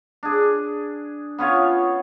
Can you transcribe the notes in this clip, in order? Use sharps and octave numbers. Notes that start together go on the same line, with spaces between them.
D4 G#4
B3 C#4 F4 C#5